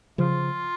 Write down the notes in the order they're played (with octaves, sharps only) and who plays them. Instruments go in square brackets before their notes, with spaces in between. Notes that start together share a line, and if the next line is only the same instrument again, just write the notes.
[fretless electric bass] C#3 F3 [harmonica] F4